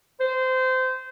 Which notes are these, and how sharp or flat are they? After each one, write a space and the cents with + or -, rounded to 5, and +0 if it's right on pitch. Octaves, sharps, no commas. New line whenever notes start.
C5 -20